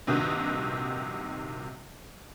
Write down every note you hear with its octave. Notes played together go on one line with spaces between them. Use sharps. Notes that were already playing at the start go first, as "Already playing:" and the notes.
A#1 G2 C3 D#3 D#4 F#4